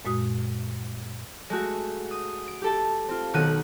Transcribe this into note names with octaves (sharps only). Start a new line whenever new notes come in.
F#2 A#2 G#3 F#4 D#6
G#3 A3 F#4
D#6
D7
G4 A4 A5
C4 F4
B1 D#3 F#5 F#6 D#7